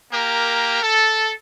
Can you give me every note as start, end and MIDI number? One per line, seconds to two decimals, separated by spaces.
0.12 0.78 58
0.12 0.78 67
0.12 0.78 70
0.82 1.32 69